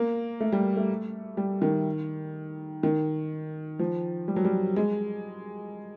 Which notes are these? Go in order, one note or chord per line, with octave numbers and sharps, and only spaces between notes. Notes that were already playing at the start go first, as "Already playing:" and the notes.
Already playing: A#3
A3
G3
A3
G3
D#3
D#3
F3
G3
F#3
G3
G#3